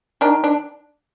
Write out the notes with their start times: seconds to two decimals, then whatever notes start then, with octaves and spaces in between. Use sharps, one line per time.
0.21 D#3 D4
0.44 D4